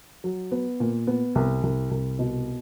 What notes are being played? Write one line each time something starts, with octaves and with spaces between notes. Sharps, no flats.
F#3
B3
A#2
B3
C2
C2
C2
B2